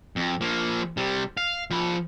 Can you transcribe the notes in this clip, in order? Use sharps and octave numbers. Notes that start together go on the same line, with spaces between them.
F2
F3 A#3
C3 G3
F5
F3 B5